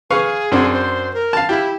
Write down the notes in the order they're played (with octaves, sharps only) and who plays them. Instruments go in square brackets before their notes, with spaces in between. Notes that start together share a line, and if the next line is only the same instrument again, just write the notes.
[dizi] G#4 [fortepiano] B4 F5 C#6
[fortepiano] F#2 C4 D4
[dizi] C5
A#4
[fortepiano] F5 A5
[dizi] E4 [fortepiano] G4